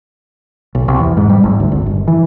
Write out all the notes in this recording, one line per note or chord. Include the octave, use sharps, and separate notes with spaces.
B1
C2
E2
G#2
G3
G#1
D2
G#1
G1
E3